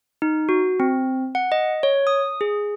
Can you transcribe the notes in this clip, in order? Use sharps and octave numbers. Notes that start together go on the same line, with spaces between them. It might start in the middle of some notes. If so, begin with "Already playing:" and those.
D#4
F#4
C4
F#5
D#5
C#5
D#6
G#4